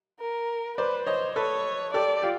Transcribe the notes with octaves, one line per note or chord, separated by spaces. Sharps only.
A#4
B4 C5 D5
C5 C#5 D#5
A4 B4 C#5
G4 A4 D5
F4 G4